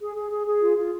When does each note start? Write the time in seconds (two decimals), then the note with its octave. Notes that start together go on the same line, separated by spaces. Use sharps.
0.01 G#4
0.16 G#4
0.31 G#4
0.47 G#4
0.62 F4
0.77 F4